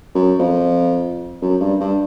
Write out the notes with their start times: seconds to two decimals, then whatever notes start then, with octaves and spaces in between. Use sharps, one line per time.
0.15 F#2
0.40 F2
1.42 F#2
1.60 G2
1.80 G2